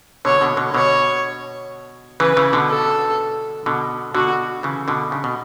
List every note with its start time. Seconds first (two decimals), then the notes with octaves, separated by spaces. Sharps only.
0.25 B2 D3 C#5
0.41 B2 D3
0.57 B2 D3
0.74 B2 D3 C#5
2.20 C#3 E3 B4
2.37 C#3 E3
2.53 B2 D3
2.68 A4
3.66 B2 D3
4.15 B2 D3 F#4
4.63 C#3 E3
4.88 B2 D3
5.12 C#3
5.24 B2